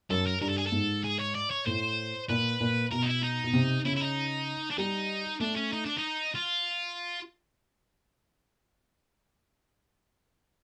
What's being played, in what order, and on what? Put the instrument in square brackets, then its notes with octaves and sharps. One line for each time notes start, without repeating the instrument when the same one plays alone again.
[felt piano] F#2 [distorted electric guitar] A4
[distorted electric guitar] A#4
[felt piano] G2 [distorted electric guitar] A#4
[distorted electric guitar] A4
G#4
A4
[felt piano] G#2
[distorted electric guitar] G#4
C#5
D5
C#5
[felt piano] A2 [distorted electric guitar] C5
[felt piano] A#2 [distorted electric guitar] B4
[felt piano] A#2
[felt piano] B2 [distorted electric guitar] A#4
[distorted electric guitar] D#4
E4
D#4
[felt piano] B2
C3
[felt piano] C#3 [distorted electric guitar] E4
[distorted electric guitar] E4
D#4
D4
[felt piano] G3 [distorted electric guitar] D#4
[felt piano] A3 [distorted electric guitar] D4
[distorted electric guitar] C#4
D#4
D4
D#4
F4